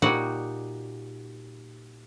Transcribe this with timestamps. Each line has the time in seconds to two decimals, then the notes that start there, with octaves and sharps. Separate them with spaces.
0.02 A#2 G3 D#4 F#4 F#5